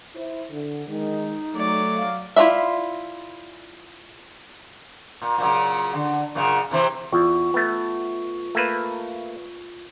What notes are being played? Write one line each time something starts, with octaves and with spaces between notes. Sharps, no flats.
E4 C5
D3
D#3 G#3 D#4
F#3 A3 D5
F5
E4 F4 A#4 D5 E5
A#2
A#2 C#3 F#3
D3
F#2 A#2 C#3
C3 E3 C4
E2 F4 C#6
A3 B3
A3 A#3 B4